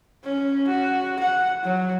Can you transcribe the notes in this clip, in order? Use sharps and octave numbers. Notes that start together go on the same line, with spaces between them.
C#4
F#4
F#5
F#3